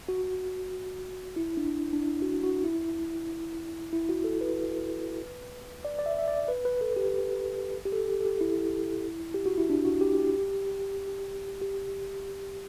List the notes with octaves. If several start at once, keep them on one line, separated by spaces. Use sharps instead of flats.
F#4
E4
D4
D4
E4
F#4
F#4
E4
E4
F#4
A4
B4
D5
D5
E5
E5
D5
B4
B4
A4
G4
G4
A4
G4
A4
G4
E4
G4
F#4
E4
D4
F#4
G4
G4
G4